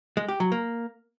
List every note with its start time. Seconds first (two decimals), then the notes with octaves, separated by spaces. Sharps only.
0.17 G#3
0.29 G4
0.40 F#3
0.52 A#3